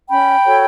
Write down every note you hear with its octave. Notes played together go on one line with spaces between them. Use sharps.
C#4 G5 B5
F#4 A4 C#5